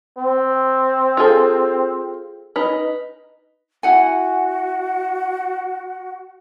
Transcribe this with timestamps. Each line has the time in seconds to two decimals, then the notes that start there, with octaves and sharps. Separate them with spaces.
0.18 C4
1.17 F4 G#4 A4
2.56 D#4 B4
3.83 E4 F#4 F#5 G#5